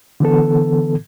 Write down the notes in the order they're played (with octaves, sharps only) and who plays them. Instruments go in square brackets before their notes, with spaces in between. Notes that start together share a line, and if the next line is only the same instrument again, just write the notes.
[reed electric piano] D3 E3 B3 A4